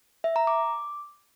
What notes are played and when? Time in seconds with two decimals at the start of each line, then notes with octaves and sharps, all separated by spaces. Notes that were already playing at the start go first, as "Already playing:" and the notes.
0.24 E5
0.36 A#5
0.47 D6